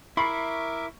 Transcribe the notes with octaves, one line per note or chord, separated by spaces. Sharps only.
E4 A#4 E5 B5 C#6 D6 C7 C#7